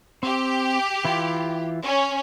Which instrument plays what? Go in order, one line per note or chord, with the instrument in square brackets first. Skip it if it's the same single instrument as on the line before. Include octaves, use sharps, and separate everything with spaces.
[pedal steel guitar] C4 [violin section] G4
[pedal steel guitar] E3 E4 F4
[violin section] C#4